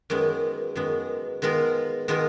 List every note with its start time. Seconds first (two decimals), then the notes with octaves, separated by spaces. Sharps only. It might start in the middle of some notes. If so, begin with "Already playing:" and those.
0.10 F#2 D#3 G#3 B3
0.75 F#2 D#3 G#3 B3
1.42 D#3 G#3 B3 F4 A#4
2.08 D#3 G#3 B3 F4 A#4